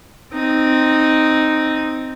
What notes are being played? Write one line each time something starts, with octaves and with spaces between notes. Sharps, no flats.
C4 D#4